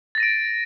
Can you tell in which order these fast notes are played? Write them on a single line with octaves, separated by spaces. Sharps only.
A6 A#6 D#7 D7